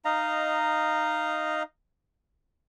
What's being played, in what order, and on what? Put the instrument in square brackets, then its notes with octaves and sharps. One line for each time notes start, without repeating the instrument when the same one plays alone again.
[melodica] D#4 D#5 F5 A#5